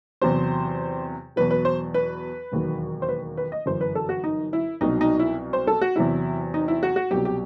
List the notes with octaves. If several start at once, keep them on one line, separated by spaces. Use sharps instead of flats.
E2 C3 F#3 C5
E2 B2 F#3 B4
B4
C5
B4
E1 D#2 D#3 F#3
C5
B4
B4
D#5
G1 F#2 E3 C5
B4
A4
F#4
D#4
E4
C2 B2 F#3 D#4
D#4
E4
C5
A4
F#4
E2 C3 F#3 E4
D#4
E4
F#4
F#4
C2 B2 F#3 G4
G4